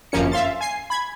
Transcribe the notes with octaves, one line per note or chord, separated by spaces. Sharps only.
G1 F#2 F3 A#3 C#4 C#7
E5 F5 C6 A6
G#5 C7
B5 G#6